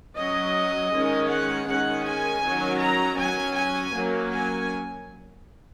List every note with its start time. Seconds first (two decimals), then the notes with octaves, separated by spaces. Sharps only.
0.17 F#3 C#4 D#5
0.93 D#3 G#3 C#4
1.30 F#5
1.68 D#3 G#3 C#4 F#5
2.06 G#5
2.43 D#3 F#3 C#4
2.80 A#5
3.18 F#3 C#4 G#5
3.56 G#5
3.94 F#3 A#3 C#4
4.32 G#5